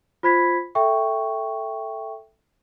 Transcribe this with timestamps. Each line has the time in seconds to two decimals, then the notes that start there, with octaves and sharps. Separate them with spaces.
0.23 F4 C5 B5 G#6 B6
0.75 A4 E5 G5 C#6